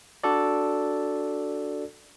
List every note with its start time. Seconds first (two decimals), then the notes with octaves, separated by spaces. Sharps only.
0.24 D4 F#4 A4 D5